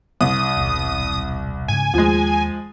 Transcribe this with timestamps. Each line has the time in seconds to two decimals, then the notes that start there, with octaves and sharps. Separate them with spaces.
0.21 C2 D#6
0.56 D#1 B1
1.68 G#2 C#3 G#5
1.94 D#2 F3 G#3